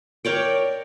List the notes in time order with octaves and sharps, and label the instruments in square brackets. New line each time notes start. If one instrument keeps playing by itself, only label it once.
[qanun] A#4 C#5 D5 G5